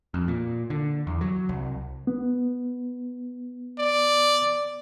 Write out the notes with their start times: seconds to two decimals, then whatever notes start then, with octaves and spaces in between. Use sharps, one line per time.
0.14 F2
0.28 A#2
0.70 D3
1.07 E2
1.21 F#3
1.49 C2
2.07 B3
3.78 D5